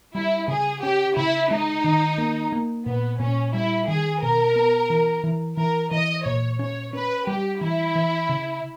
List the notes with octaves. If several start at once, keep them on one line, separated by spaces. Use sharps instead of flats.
G3 E4
C#3 G#4
C#4 G4
C#3 E4
G#3 D#4
D#3
A#3
A#3
A#2 B3
A#2 C#4
G3 E4
D#3 G#4
B2 A#4
B3
E3
E3
E3 A#4
E3 D#5
A#2 C#5
C#4 C#5
C#4 B4
G3 G4
E3 E4
E3
C#3